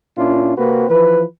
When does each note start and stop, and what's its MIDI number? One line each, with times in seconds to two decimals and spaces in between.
0.17 0.54 46
0.17 0.54 61
0.17 0.54 62
0.17 0.54 64
0.17 0.54 65
0.58 0.85 48
0.58 0.85 58
0.58 0.85 60
0.58 0.85 66
0.58 0.85 71
0.90 1.23 52
0.90 1.23 53
0.90 1.23 71